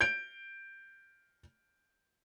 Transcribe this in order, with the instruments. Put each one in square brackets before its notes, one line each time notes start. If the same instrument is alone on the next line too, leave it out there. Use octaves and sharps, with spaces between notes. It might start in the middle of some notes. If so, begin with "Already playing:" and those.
[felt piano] G6 D7